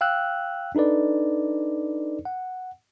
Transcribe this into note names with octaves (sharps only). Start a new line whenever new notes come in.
F5 G5 E6 F#6
D4 D#4 A4 B4 D5
F#5